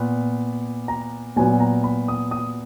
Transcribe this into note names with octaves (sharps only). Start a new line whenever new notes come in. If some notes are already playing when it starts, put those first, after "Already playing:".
Already playing: A#2 B3
A#5
A#2 F#3 B3 G#5
A#5
B5
D#6
D#6